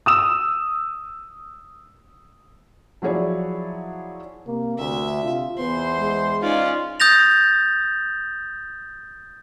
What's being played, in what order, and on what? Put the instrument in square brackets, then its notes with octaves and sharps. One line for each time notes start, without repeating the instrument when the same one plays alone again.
[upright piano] D#6 E6 E7
[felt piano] F3 F#3 E4 G#4 C#5 D5
[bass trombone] C3 [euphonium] A#3
[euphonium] D2 [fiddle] E5
[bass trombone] C3 [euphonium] F4
[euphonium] E2 [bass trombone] B3 [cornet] C5 [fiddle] C6
[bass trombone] G#3
[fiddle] C#4 D5 [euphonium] D#4 [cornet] F4
[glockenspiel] D#6 G6 A6 A#6 F7